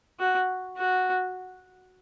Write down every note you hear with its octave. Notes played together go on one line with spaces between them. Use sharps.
F#4
F#4